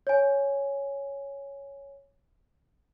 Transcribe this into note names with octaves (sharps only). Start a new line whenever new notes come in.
C#5 G#5